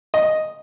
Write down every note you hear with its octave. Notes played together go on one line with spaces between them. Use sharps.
D#5